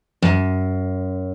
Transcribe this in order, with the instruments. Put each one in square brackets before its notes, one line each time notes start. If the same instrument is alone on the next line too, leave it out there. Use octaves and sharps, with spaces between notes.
[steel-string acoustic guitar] F#2